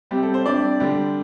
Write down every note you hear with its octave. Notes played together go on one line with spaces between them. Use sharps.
C3 G3 C4 G4
A4
C5
C3 G3 D4 D5
D3 G3 D4